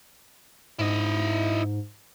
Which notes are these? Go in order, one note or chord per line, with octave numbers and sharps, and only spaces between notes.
G#2 E4 D#5